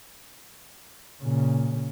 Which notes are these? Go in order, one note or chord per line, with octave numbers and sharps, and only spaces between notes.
A#2 C#3